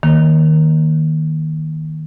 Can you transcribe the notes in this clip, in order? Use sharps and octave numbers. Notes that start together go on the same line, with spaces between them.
D#3 A#3